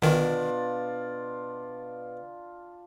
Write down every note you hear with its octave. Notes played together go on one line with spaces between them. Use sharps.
G1 B2 D#3 D4 F4